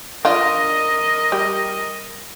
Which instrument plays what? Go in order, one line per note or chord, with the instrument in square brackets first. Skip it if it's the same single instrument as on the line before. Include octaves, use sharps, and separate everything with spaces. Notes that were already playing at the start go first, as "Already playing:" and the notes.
[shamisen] D4 F4 [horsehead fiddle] A#4 D#5
[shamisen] G3